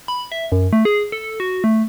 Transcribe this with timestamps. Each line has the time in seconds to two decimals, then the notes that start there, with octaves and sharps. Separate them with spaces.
0.08 B5
0.32 E5
0.52 F#2
0.73 A3
0.85 G#4
1.12 A4
1.40 F#4
1.64 A3